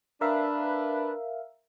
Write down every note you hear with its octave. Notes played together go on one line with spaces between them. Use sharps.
D4 A#4 B4 E5 F5